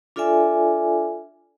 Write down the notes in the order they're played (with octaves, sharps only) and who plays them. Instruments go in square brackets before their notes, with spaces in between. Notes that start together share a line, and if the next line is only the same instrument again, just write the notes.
[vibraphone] D4 F4 A4 D5 E5 G#5